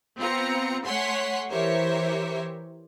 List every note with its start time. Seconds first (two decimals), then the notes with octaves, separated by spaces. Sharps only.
0.18 B3 C4 F4 A#5 C#7
0.85 A3 C#5 F#5 G#5 C6 B6
1.49 E3 G4 A#4 C5 C#5 E5